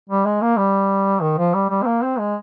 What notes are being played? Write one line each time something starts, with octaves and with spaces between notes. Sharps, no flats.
G3
G#3
A#3
G3
D#3
F3
G3
G3
C4
A#3
C4
G#3